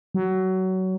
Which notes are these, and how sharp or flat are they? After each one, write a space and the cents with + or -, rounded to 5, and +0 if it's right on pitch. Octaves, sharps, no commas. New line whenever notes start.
F#3 +20